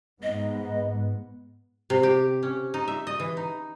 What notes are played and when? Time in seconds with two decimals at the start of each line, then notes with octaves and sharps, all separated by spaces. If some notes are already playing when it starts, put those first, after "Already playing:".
0.23 G#2 B3 D#5
1.90 C3
2.03 G4
2.43 C#4
2.74 D#4
2.88 E5
3.07 D#5
3.20 E3
3.37 D#4